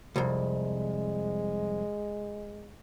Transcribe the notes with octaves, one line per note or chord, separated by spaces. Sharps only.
C2 F2 G#3